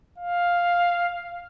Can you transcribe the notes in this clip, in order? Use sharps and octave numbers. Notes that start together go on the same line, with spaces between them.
F5